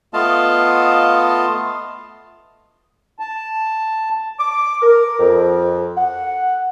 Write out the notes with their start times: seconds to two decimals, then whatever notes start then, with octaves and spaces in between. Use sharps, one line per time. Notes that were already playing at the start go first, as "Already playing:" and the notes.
0.14 A3 B3 F4 D#5 F5 A5
3.19 A5
4.39 D6
4.82 A#4
5.19 F2
5.96 F#5